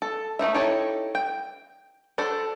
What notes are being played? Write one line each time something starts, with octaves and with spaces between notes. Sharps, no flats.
A4
A3 C4 D#4 E5
D#4 E4 G4 A4 C#5
G5
D4 F#4 A4 C5